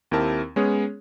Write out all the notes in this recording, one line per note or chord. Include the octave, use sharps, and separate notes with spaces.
D#2 C4 E4 G4 A#4 A5
G#3 B3 C#4 G#4 C#5